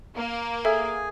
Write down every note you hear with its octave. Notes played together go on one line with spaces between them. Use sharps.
A#3
G#4 A4 E5 G#5